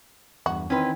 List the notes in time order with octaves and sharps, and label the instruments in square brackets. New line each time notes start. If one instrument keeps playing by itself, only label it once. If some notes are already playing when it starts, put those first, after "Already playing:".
[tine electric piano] E2 G2 [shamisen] F#4
[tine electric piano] D#3 E3 D#4 [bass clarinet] C4 [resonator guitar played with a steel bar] C#4 B4